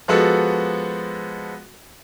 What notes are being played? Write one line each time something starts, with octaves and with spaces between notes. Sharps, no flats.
F3 G#3 B3 F#4 A4